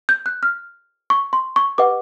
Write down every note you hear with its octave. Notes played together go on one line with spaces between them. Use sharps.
G6
F#6
F6
C#6
C6
C#6
G4 B4 D#5 F#5 D6